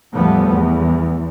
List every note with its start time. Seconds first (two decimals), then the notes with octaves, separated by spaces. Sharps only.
0.15 E2 A2 F3 G3 A3 B3
0.52 E2